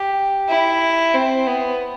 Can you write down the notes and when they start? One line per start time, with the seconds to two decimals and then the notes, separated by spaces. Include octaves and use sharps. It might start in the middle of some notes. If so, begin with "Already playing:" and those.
Already playing: G4
0.49 E4
1.14 C4
1.47 B3